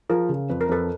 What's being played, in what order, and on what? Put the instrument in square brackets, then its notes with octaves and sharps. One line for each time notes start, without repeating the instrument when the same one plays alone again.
[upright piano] F3 [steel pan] G#4 A#4
[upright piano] C#3
[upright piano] F2 [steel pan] B4
[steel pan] A#4
[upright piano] F2 [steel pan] A4 B4